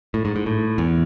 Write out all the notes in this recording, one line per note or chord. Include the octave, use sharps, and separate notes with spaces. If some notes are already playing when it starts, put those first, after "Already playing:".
A2
G#2
G#2
A2
E2